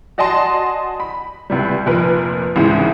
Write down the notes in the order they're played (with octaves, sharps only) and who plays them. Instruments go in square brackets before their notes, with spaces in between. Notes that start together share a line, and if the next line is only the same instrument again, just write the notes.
[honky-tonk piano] F#4 D5 D#5 G#5 A5 C6
B5
C#2 C3 G3
F1 A#2 F3 A#4 B4
C2 G#2 C#3 E3 G#3